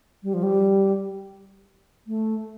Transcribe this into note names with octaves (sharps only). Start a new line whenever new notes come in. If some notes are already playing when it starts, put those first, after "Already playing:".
G3
F3
G3
A3